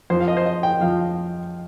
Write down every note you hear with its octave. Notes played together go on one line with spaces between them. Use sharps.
F2 F3 C5
F5
D#5
C5
D#5
G5
F2 F3 F5